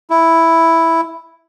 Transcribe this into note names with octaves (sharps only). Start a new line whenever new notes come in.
E4